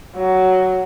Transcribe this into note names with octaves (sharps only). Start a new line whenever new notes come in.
F#3